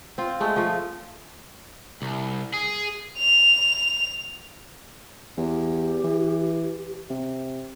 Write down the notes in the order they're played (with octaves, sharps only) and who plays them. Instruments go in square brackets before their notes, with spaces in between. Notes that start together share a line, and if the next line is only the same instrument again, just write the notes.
[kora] C4 F4
G#3 A3
F3 A3
[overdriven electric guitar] C2
G#4
[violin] F7
[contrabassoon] E2 [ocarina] G4
[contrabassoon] E3
C3